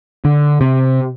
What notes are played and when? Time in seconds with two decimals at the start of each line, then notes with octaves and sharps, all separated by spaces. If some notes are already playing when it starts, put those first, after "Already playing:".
0.25 D3
0.61 C3